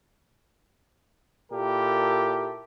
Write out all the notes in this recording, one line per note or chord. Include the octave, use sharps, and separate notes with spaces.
A#2 E4 G4 A4 A#4